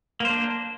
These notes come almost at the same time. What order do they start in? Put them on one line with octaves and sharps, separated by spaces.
A#3 C5 D4